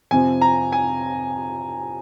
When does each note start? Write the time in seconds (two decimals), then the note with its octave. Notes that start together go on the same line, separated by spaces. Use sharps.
0.11 F2 C3 F3 G#5
0.41 A#5
0.72 G#5